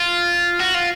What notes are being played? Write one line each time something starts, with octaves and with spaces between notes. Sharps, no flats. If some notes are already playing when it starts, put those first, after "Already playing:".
Already playing: F4
F#4
F4